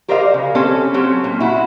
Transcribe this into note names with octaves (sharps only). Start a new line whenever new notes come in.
G4 A#4 C5 D5 D#5 F5
C#3
C4 C#4 G4 A4 C5
F#3 C4 C#4 G4
A#2
E4 F#4